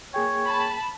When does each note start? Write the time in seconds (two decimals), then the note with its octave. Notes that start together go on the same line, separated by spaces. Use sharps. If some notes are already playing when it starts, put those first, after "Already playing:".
0.14 A#3 G#4 C#5 G5
0.46 A5 B5